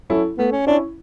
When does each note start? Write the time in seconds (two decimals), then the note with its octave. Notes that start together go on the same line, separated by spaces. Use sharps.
0.10 F#3 C#4 E4 A4
0.38 A3 B3
0.52 C#4
0.67 C#4 D4 E4